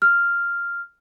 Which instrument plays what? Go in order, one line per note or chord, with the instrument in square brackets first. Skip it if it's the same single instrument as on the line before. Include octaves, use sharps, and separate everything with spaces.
[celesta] F6